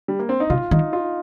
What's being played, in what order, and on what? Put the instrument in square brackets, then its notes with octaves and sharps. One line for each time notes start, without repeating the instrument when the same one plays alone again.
[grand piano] G3
A#3
C4
D#4
[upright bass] C3 [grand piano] F4
[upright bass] D#3 [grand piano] D#4
[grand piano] F4